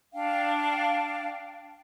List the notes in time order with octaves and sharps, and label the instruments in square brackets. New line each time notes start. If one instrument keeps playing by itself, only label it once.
[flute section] D4 F5 G5